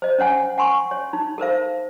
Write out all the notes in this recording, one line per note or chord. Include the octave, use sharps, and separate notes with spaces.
C5 D#5
C#4 C#5 F#5 G#5
F#5 G#5 C6 C#6
C#5
D#4
A4 A#4 C5 F5